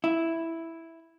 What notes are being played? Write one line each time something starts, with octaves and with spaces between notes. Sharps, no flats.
E4